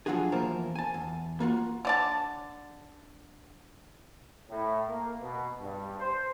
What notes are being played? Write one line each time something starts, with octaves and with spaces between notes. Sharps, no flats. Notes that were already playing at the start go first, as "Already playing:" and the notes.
F3 F#3 D4 F4 F#4 G#4
E2 F3 A#3 A#4 A5
G#5 A5
E2
A#3 F4 F#4
D3 D5 A5
A2
A#3
B2
G2
C5